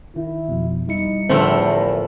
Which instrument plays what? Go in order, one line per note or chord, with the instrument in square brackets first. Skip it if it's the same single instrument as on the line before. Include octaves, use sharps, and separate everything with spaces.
[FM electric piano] D#3 [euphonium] E4
[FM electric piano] F2 B2
[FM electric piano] G3 E4 C#7 [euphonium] D#4
[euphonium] E2 [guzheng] A2 F3 A3 [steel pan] D3 C4 C5
[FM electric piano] A4 A#4 A#5